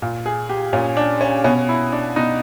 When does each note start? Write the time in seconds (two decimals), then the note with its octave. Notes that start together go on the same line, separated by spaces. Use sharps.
0.02 A#2
0.26 G#4
0.49 G4
0.73 A#2 C#4
0.97 D4
1.21 C#4
1.44 B2 C#4
1.69 E4
1.92 D4
2.16 B2 D#4